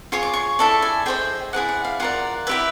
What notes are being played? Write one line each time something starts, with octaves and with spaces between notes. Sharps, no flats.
F4 G#4 C#5 C#6
D6
C#6
E4 A4 D5 A5
G#5
G#4 C5 D#5 G5
E4 G#4 B4 D5 F#5
F#5
F5
F4 A#4 D5 F#5
E4 G4 B4 E5